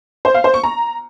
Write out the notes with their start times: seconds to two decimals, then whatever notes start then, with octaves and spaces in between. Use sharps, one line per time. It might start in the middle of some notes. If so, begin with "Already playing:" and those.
0.25 C5
0.34 F5
0.44 C5
0.54 C#6
0.63 A#5